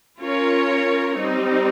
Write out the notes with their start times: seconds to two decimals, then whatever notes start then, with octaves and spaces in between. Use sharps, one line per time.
0.21 C#4 F4 A#4 C#5
1.18 G3 C4 D#4